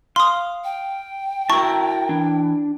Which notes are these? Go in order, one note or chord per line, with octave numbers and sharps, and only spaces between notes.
F5 C6 D#6
G5
E4 F#4 A#4 A5 C#6 E6
E3 D4